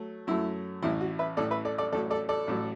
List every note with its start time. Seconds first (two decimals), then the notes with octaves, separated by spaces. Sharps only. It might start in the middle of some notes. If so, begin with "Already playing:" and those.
Already playing: F#3 A3
0.27 F#2 F#3 A3 E4
0.82 A1 A2 E3 E4
1.01 F#4
1.19 B4 E5
1.37 A1 A2 E3 A4 D5
1.51 B4 E5
1.65 A4 D5
1.78 A4 D5
1.92 A1 A2 F#3 A4 D5
2.11 A4 D5
2.29 A4 D5
2.47 A1 A2 F#3